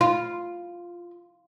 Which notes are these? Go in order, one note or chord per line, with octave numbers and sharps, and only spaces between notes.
F4